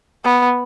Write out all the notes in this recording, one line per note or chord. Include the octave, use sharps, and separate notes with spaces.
B3